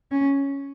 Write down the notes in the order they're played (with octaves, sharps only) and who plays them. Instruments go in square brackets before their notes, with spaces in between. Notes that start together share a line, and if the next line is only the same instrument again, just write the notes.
[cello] C#4